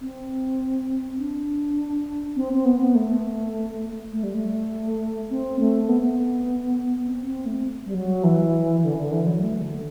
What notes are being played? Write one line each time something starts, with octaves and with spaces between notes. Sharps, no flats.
C4
D4
C4
C4
B3
B3
A3
A3
G3
A3
C4
A3
B3
C4
C4
A3
G3
F#3
E3
D3
D3
E3
F#3
A3
D3